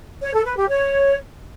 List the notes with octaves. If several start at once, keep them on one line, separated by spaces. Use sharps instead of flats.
C#5
A4
B4
G4
C#5